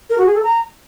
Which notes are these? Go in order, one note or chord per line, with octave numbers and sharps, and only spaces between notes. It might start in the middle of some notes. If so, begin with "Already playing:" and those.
A#4
F#4
G#4
A4
A#5